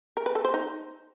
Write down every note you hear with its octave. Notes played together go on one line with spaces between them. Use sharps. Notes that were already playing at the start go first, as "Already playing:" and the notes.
A#4
B4
A4
C5
D#4